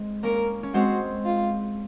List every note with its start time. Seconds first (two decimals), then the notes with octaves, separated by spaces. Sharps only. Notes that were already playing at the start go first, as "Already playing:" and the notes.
Already playing: G#3 C4
0.23 A#3 C#4 A#4
0.63 C#4
0.74 G#3 C4 F#4
1.26 F4